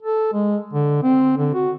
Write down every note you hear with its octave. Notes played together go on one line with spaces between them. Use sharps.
A4
G#3
D3
C4
D3
F#4